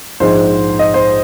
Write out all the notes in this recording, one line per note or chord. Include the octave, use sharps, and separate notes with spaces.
A#1 G#2 G#3 C5
D#5
C5